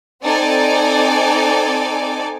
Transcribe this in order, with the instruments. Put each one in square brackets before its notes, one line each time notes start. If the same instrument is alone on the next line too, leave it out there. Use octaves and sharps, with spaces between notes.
[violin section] C4 D#4 A4 D5 G#5 D6